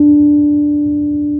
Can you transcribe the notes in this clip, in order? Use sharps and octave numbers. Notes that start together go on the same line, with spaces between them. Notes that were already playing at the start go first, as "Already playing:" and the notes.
Already playing: D4